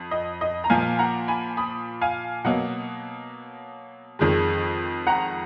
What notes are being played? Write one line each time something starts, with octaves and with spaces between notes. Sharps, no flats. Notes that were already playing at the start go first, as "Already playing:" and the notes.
Already playing: F2
D#5
D#5
A#5
A#2 F3 A#3 F5 G#5
F#5 A#5
G#5 B5
B5 D#6
F5 G#5
B2 F#3 A#3 D#5 F#5
F2 D#3 G#3
F#5 A#5